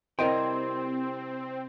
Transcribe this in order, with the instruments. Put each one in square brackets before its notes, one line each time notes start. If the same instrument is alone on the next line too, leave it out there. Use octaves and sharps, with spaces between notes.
[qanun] C3 G3 E4 [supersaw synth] C4 [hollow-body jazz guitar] A#4 D#5 G5 [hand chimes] C6